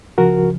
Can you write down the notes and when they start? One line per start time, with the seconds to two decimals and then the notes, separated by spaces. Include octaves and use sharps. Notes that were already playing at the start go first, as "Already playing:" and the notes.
0.18 C#2 C#3 F3 F#4 A#4